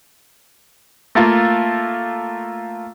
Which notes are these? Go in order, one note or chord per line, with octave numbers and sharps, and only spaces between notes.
A3 A#3 F4